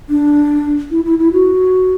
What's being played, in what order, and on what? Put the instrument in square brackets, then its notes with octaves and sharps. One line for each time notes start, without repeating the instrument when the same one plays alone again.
[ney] D4
E4
E4
E4
F#4